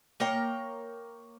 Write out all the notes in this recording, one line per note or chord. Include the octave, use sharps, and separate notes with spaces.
A#3 A#4 C#5 G5